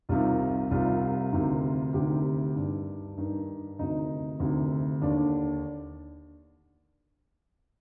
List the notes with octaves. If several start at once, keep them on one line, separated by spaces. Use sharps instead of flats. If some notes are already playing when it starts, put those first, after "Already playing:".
C2 C3 D#3 F4
C2 C3 D#3 F4
D2 C3 D#3
D2 C3 D#3 G4
G2
D#3
G2 D#3
D2 C3 D#3 D#4
D2 C3 D#3
D#2 D3 D4